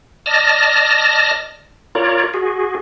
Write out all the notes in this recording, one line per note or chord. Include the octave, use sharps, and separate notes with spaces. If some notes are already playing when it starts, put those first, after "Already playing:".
D5 D#5 A5 F6 A#6
F4 A#4 C#5 D5
F#4 G#4